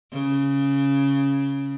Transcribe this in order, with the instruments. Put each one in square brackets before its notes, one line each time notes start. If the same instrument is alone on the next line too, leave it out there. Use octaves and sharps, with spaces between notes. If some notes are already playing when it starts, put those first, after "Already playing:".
[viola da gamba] C#3